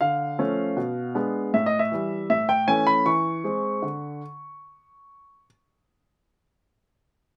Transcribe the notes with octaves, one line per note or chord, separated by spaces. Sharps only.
D3 F5
F3 A3 C#4
B2
G#3 B3 D4
A2 E5
D#5
E5
E3 G3
A2 E5
G5
E3 A3 C#4 G#5
B5
E3 C#6
G#3 C4
D3